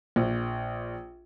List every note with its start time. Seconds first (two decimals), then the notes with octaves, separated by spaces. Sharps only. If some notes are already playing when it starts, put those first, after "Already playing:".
0.16 A#1